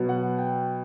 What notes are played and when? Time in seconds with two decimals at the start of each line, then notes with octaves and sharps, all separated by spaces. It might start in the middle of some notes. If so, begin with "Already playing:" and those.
Already playing: B2 F#3 B3
0.09 F#5
0.38 G5